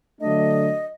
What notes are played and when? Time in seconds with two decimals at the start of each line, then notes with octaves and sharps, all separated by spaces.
0.21 D3 F#3 A3 D4 D#5